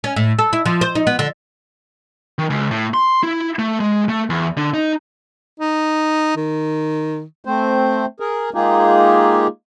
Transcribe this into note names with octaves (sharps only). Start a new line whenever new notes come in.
C#4
A2
A4
E4
F3
C5
D#4
B3
D3
D#3
C#2
A2
C6
E4
A3
G#3
A3
E2
D3
D#4
D#4
D#3
A3 C4 C5
G#4 A#4
G#3 A#3 D#4 F4 G4 G#4